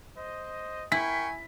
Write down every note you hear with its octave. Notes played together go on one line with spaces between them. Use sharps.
C5 D#5
E4 A#4 G5 G#5 C#6 B6